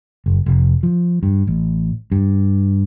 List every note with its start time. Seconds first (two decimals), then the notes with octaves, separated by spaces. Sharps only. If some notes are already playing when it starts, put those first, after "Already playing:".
0.26 F#1
0.46 F1
0.83 F3
1.23 G2
1.47 A1
2.12 G2